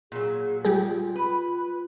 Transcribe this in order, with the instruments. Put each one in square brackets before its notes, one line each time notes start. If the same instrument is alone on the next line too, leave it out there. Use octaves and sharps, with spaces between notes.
[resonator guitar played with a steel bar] A#2 F#3 [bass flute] G#4
[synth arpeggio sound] G3 G4 G#4 [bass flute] F4
[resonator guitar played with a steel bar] B4